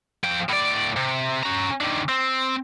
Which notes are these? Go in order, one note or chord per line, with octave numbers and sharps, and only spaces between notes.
F3 G5
A2 D5
C3
C#4 A#5
D#3 D4
C4